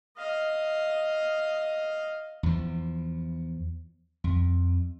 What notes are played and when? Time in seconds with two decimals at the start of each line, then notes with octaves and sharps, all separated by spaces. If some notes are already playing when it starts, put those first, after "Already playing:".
0.17 D#5 F5
2.43 E2 F3
4.24 F2